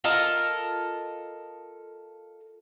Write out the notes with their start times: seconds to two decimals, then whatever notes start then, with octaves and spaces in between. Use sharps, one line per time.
0.04 F4 A4 A#4 D#5